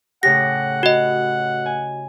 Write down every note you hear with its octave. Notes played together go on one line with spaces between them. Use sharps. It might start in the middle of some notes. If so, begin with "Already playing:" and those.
A2 C#3 G4 F#5 A#6
F#4 D#5
G#5